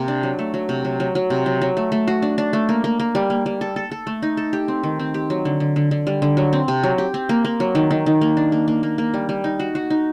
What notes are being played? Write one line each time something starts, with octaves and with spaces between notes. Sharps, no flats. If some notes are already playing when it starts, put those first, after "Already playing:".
Already playing: C3 A#3
D4
F#3
A3
F#3
C3
F#3
F#3
F#3
C3
F#3
F#3
A3
A3
F#4
D4
D4
A3
A#3
A#3
A#3
G3
A#3
G3
A4
A4
A4
A3
D#4
A4
G4
C4
D#3
C4
G4
F#3
D3
D3
D3
D3
G3
D3
F#3
C4
C3
F#3
G4
C4
A#3
A#3
F#3
D#3
D#3
D#3
A#3
D4
A#3
A#3
A#3
A#3
G3
G3
D#4
F#4
F#4
D#4